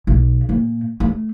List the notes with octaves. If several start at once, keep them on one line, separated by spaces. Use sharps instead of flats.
B1
A#2
A3 A#3